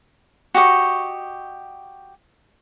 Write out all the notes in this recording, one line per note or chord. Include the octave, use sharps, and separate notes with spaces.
F#4 G4 D#5 C#6